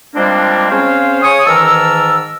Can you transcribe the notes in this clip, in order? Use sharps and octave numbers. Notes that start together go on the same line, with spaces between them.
F3 G3 G#3 A#3 C4 D4
C4 C#4 G#4 C5 C#5 F5
C#3 C#5 G#5 C#6 D#6
G#2 D#3 E3 A#4 A5 E6